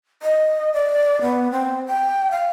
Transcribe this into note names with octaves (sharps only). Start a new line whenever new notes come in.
D#5
D5
B3
C4
G5
F5